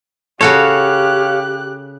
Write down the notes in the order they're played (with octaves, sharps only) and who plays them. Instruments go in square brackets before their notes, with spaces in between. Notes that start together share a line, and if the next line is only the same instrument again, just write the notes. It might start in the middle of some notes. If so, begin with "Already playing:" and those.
[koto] C#3 F#4 A4 [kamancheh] G4 F#6 [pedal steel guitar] C#5 F5